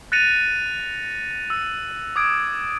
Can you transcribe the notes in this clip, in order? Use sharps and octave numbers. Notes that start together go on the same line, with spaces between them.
F#6 A6 A#6 C#7 D#7 F7
E6
D6 D#6 G#6 D7